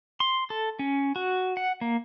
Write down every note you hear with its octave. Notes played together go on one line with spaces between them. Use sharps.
C6
A4
C#4
F#4
F#5
A#3